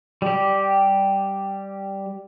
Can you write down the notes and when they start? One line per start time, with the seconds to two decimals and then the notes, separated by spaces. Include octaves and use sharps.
0.22 G3 G4